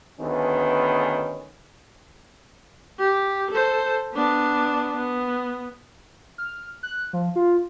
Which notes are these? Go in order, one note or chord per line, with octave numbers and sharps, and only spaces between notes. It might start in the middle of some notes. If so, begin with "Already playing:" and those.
D2 D#3 B3 C#4 G#4 B4
G4
A4 C5
B3 D4
B3
F6
F#6
F3
F4